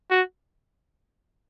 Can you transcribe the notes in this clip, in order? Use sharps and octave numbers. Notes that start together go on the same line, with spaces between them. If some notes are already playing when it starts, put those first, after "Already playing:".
F#4